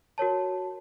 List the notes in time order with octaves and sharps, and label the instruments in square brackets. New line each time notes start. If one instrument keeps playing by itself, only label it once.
[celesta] F#4 A#4 C#5 A5